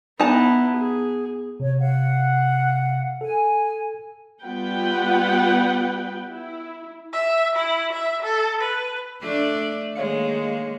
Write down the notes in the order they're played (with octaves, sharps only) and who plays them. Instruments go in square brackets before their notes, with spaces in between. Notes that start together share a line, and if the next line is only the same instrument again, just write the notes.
[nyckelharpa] B3 E4 [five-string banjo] D#4 A5
[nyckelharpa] G#4
[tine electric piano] C3 [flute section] C#5
[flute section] F5 F#5
[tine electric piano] A4 [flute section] G#5
[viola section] G3 B3 F4 B4 F#5 G5
E4
[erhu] E5
E4
E5
A4
B4
[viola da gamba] A3 D4 D5
[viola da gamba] D#3 G#3 A#3 [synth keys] C#5 F5 C#7